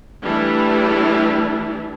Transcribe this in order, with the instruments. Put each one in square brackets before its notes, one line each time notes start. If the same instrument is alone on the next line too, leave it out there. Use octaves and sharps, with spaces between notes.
[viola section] E3 G3 A3 D4 E4